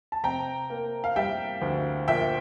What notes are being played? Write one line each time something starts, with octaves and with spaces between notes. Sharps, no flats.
A5
C3 G5 A#5
A#3
F5
G3 E5 G5
D2
A#2 E5 G5